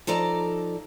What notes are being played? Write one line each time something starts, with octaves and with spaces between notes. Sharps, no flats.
F3 D#4 A4 D5 A#5